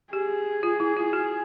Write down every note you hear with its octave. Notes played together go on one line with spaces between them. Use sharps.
G4 G#4
F4
E4
F4
F#4